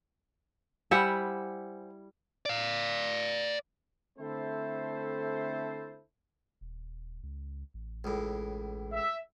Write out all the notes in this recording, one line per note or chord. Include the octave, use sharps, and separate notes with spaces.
G3 E4 C5 E5 F#5 G#5
D5 F5
D3 A3 C4 E4 A4 C5
D#1
C#2
A1
C#2 A2
E5